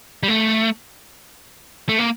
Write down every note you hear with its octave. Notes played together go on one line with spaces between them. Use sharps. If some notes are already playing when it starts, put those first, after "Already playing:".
G3
A3
A3
A#3